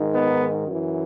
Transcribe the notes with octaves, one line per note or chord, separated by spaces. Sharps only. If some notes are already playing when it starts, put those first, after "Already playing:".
Already playing: G#2 D#3
B3 D#4
F#2 E3